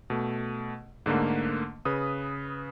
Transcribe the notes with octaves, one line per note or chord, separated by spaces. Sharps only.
B2 A3
G#2 D3 A3 A#3
C#3 B4 D#6